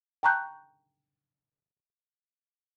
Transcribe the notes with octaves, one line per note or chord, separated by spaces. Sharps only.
G5 A5 A#5 C#6 F#6 G6